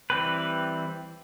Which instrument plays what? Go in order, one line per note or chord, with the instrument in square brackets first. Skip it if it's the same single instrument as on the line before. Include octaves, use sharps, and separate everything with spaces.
[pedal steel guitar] E3 G3 C4 B4